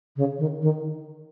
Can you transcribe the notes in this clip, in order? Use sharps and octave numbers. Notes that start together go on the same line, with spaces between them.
C#3
D#3
D#3